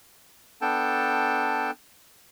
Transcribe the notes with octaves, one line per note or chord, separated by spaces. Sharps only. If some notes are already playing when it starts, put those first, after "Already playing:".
B3 D4 A4 G5 A5